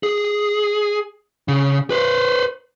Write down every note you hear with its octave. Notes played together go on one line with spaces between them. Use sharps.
G#4
C#3
B4 C5